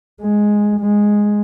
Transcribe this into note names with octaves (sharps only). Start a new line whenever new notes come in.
G#3
G#3